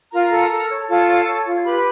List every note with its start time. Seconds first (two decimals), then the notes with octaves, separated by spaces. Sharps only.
0.12 F4 A#4 A#5
0.31 A4
0.51 A4
0.70 C#5
0.88 F4 A4 A5
1.07 C#5
1.26 C#5
1.45 F4
1.64 G4 B4 B5